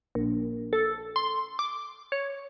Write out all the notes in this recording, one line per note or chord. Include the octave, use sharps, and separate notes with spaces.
A#1
A4
C6
D6
C#5